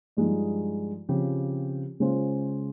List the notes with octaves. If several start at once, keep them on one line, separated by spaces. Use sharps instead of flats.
G2 F3 G#3 D#4
C#3 F3 C4 G4
C#3 G#3 C#4 F4 C5